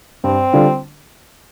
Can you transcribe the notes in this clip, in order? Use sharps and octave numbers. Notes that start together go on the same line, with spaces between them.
G2 C4
D3 G3 D4 F4